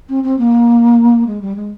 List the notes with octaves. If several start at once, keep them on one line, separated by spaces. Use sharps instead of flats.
C4
C4
A#3
G#3
G3
G#3